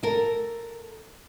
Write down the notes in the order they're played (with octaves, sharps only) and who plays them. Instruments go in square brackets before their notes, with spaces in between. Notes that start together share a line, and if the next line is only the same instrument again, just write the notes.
[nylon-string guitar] A4 A#4